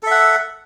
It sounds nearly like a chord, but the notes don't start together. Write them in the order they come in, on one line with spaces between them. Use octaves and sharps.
A4 E5 F#5